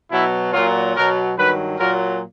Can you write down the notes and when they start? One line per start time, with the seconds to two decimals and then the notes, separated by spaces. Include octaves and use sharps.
0.11 B2 F#3 E4
0.53 A#2 F#3 F4
0.95 B2 F#3 A#4
1.36 G2 D#3 F#3 B4
1.78 A#2 F#3 A#4